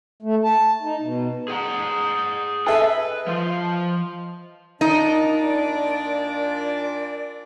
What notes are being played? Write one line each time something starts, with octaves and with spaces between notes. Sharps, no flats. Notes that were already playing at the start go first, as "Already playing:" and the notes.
A3
A5
D#4
B2
G#4 F#5 A#5
G#4 A4 B4 E5
D#5
F3 F4
A#2 D4 D#4 D5